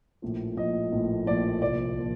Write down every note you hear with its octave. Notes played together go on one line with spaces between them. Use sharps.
A#1 A2 F3
A#1 A2 F3 D#5
A#1 A2 F3
A#1 A2 F3 D5
C2 A#2 F3 D5
A#2 F3